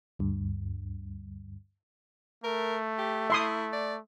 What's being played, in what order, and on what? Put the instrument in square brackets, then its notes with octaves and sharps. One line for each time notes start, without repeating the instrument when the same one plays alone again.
[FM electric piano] D2 G2
[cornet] A3 [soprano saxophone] A#4
[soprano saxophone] G4
[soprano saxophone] E4 [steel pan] E5 C6 D#6
[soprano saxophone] D5